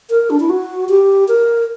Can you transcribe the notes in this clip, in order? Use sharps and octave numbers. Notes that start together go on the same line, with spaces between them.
A#4
D4
E4
F#4
G4
A#4